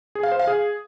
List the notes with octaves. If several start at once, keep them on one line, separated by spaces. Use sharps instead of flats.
G#4
F5
C5
F5
G#4